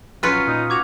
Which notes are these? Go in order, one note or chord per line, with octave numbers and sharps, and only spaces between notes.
A#1 F#3 C#4 F4 B4 F6 C#7 D#7
A#2 D#4
F#4 D6 G#6 F7